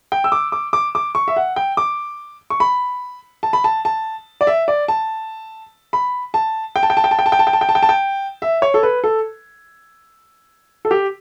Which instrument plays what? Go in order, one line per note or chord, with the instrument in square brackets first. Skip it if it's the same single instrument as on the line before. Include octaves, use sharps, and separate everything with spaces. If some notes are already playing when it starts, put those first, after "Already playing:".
[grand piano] G5
E6
D6
D6
D6
D6
C#6
E5
F#5
G5
D6
C#6
B5
A5
B5
A5
A5
D5
E5
D5
A5
B5
A5
G5
A5
G5
A5
G5
A5
G5
A5
G5
A5
G5
A5
G5
A5
G5
A5
G5
E5
C#5
A4
B4
A4
A4
G4